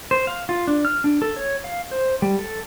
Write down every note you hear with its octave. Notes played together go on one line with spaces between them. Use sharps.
C5
F5
F4
D4
F6
D4
A4
C#5
F5
C5
G3
A4